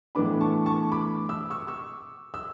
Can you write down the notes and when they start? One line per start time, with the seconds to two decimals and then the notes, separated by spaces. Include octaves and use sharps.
0.15 A2 E3 B3 D4 B5 D6
0.41 A5 C#6
0.66 A5 C#6
0.92 B5 D6
1.29 E6
1.50 C#6 E6
1.67 C#6 E6
2.34 E6